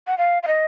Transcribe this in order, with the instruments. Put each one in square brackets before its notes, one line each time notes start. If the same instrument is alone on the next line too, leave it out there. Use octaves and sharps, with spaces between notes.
[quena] F#5
F5
F5
D#5